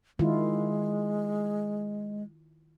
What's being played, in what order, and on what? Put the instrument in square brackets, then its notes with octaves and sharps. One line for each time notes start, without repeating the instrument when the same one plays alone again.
[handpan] D#3 E4 F4 [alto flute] G#3